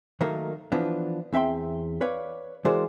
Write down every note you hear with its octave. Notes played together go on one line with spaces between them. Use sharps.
D#3 F#3 A3 A#3 D#4 A#4
E3 F3 B3 D4
E2 C4 E5 G5 C6
B4 C#5 D5 F5
E3 G#3 F#4 A#4 C5 D5